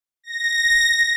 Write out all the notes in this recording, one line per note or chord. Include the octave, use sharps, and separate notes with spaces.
A#6